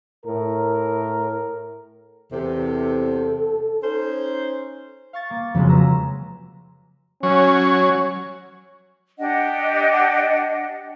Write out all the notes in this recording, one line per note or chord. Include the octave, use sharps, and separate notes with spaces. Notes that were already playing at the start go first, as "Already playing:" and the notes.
A2 A#4
E2 C3 A4
C#4 D#4 C5
F5 C#6 A6
A#3
F2 C#3 F3 F#3 G#3
B4 A#5 E6
F#3 C#4 C#5
D4 G4 D#5 F#5